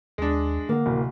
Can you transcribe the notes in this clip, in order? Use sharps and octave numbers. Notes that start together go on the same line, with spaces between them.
D#2 G#3 D4
D3 A#3 F#5
D1 C3